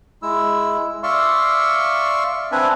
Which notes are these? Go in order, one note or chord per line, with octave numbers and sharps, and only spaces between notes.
G#3 E4 E6
D5 E5 F5 C6 C#6 E6
C4 D4 B4 E5 G#5